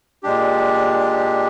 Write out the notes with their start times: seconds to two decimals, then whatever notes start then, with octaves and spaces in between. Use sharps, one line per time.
0.23 A#2 G#3 D4 G4